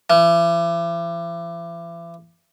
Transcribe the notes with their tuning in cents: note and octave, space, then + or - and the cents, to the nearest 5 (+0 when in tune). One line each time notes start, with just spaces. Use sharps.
E3 +40